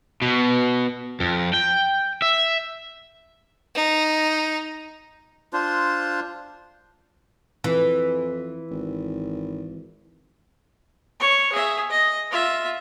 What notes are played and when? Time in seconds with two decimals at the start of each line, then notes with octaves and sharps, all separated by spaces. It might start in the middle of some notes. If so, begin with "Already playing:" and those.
0.22 B2
1.20 F2
1.54 G5
2.22 E5
3.75 D#4
5.53 D4 F4 C5
7.64 F2 E3
8.71 G#1
11.20 C#5 C#6
11.53 G#4 E5
11.90 D#5
12.31 F4 E5